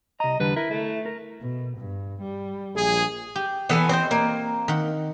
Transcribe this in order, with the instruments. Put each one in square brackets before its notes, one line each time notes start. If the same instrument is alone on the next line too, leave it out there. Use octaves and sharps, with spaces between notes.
[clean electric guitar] C2 A#5 [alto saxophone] D#5
[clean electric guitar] E2 D3 G3 [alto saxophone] B4
[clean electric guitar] E4 [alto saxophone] A#4
[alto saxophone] A3
[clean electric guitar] A#4
[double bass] B2
G2
G3
[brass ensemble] A#1 G#4
[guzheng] G4
[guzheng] E3 [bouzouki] B3 A4 G#5
[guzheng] C4 D#5 G5 [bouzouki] C5
[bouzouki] A#3
[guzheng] D#3 F#5